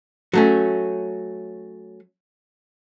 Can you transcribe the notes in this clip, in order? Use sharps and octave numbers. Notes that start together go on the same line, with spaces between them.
F#3 A3 C#4